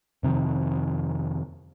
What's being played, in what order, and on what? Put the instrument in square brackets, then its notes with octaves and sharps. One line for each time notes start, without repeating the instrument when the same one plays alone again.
[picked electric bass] F2 C3 D#3 F3